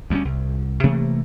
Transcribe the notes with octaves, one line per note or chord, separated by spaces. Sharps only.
D2 G3 G#3 C#4
C2
C3 E3 A3 A#3